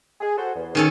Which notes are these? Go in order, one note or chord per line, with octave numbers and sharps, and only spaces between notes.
G#4
F#4 A4 C5
E2
D#3 C#4 G#4 A4